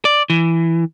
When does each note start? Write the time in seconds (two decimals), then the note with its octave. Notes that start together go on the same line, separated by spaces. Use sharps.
0.05 D5
0.30 E3